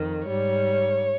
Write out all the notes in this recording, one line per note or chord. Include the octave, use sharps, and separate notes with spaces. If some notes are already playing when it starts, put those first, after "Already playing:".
Already playing: F2 D#3
G#2 G3 C#5